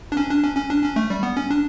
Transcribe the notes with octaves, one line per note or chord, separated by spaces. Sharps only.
D4
C#4
D4
C#4
C#4
D4
C#4
A3
G3
B3
C#4
D4